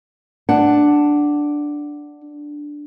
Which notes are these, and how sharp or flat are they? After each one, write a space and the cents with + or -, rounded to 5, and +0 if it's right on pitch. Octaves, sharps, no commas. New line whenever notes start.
D4 +0 F#5 +5